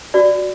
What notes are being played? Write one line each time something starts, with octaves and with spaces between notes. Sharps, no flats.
F#4 D5